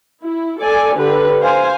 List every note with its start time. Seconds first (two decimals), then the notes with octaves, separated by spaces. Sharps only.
0.23 E4
0.60 A4 D5 G#5
0.95 D3 G4 B4
1.42 C5 F5 G#5